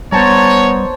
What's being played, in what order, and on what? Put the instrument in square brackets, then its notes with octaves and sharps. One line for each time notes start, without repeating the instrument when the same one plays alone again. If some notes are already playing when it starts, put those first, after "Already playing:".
[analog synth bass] G3 [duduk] B3 [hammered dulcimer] C5 A5 A#5 [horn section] C#5